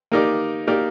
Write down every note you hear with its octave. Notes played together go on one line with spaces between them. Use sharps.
A#3 D#4 G4 A#4 D5
A#3 D#4 G4 A#4 D5